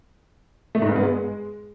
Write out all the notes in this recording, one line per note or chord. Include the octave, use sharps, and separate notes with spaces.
A3
G#2
G2
B3
G#3